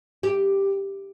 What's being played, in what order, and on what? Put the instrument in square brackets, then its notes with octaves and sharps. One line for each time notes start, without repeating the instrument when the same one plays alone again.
[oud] G4